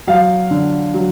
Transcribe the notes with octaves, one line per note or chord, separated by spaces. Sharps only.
F#3 F5
D3
F#3